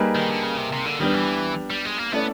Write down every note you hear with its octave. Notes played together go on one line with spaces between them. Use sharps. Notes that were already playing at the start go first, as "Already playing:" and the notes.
Already playing: G3 A#3 D#4 G#4 B4
D#3
D3
C#3
C3
C3
D3
D#3 G3 B3 D4
E3
G3
G#3
A#3
A3 B3 C#4 E4 A4 D5